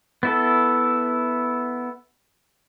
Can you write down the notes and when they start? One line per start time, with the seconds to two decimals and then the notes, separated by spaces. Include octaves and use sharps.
0.23 B3 E4 A4